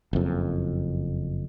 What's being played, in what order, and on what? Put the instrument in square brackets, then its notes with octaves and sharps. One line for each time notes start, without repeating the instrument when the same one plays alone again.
[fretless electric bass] F#1 F2